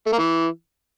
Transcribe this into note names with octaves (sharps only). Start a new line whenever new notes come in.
A3
A#3
E3